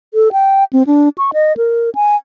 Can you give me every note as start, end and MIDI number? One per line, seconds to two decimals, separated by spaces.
0.14 0.32 69
0.32 0.64 79
0.73 0.83 60
0.87 1.09 62
1.18 1.31 85
1.33 1.56 75
1.57 1.90 70
1.95 2.16 80